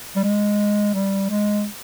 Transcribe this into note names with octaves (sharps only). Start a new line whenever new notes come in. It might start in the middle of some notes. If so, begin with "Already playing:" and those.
G3
G#3
G3
G#3